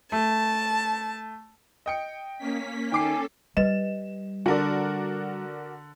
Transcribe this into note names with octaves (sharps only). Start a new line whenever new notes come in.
A3 A5
D#5 G5 C#7
A#3 C#4 B6
D#3 C#4 A4 G5 G#5 D6 C7
G3 B4 D#5 E7
D3 F#4 A#4 D5